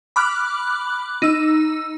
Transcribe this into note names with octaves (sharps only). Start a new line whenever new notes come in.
B5 D6 F6 F#6
D#4 E6